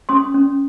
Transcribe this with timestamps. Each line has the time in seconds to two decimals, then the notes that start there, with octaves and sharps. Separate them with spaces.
0.09 C#4 C6 D#6
0.34 C#4